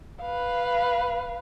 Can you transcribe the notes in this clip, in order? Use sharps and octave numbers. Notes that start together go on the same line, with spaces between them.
B4 F5